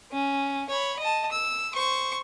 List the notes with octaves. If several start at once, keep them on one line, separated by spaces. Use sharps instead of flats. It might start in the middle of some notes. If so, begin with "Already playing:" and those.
C#4
C#5 B5
D#5 A5
E6
C5 C#6